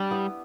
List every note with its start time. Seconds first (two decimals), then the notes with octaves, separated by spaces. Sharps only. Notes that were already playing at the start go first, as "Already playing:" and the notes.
Already playing: G3 D4 G4
0.11 B3 E4